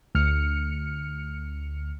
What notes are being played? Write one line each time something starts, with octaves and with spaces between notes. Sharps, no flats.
D2 F6 C#7